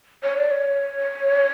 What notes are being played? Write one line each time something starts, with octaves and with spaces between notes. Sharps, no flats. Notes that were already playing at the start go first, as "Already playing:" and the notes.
C#5
D5
C#5